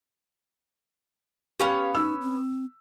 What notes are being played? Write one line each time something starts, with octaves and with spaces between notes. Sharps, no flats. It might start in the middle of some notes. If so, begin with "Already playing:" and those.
B3 C#4 G4 C#5 F5
D#4 E6
C4